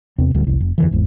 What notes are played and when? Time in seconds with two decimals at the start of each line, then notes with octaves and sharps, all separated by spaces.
0.18 E2 C3 C4
0.35 D1 D2 G3
0.47 F1 C2
0.60 F1
0.78 F2 D3 E3
0.91 G#1 E2 G#2